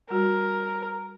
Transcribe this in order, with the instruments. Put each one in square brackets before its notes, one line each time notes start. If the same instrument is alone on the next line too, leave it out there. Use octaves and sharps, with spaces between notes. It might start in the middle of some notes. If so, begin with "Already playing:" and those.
[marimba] G3 F#4 [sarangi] A#4